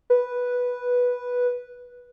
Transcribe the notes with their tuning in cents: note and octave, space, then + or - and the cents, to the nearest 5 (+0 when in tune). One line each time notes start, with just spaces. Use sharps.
B4 -5